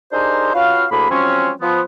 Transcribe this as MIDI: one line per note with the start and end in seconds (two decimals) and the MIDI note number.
0.13 0.53 62
0.13 0.53 63
0.13 0.53 67
0.13 0.53 68
0.13 0.53 70
0.13 0.53 72
0.54 0.85 61
0.54 0.85 65
0.54 0.85 66
0.54 0.85 71
0.54 0.85 77
0.91 1.07 38
0.91 1.07 45
0.91 1.07 50
0.91 1.07 58
0.91 1.07 68
0.91 1.07 83
1.10 1.50 53
1.10 1.50 54
1.10 1.50 56
1.10 1.50 60
1.10 1.50 61
1.61 1.82 53
1.61 1.82 59